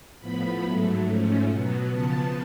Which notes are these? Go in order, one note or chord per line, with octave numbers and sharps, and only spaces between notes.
A2 F3 B3 B5
G#2 F#3 A3
G#2 F3 A3 C#4
B2 F#3 B3
C#3 F3 B3 A5